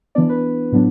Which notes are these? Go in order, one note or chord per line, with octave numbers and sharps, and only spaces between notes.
E3 B3 D4 D5
B4
A2 F#3 B3 D4